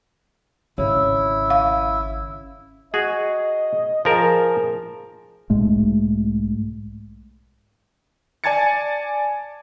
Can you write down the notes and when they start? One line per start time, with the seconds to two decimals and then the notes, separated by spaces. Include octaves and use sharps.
0.78 G#1 C#3 E4
1.50 F5
2.94 F#4 G#4 D#5
4.05 F3 G#4 A#4 A5
5.50 B1 G#2 G#3 A3
8.44 D5 G#5 A5 G#6 A6 C#7